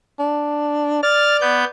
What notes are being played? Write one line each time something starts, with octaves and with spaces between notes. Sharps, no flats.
D4
D5 F6 A6
B3 G6